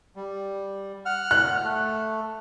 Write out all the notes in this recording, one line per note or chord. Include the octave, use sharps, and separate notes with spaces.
G3
F#5 F6
F#6
A3